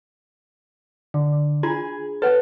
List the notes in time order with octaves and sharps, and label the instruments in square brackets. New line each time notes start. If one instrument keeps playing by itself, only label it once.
[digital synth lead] D3
[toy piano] D4 F4 A#5 [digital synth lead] G#4
[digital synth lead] A4 [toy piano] B4 C#5 F#5